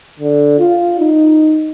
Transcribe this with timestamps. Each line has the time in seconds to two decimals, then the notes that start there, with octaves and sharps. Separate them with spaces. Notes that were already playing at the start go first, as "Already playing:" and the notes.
0.20 D3
0.59 F4
1.00 D#4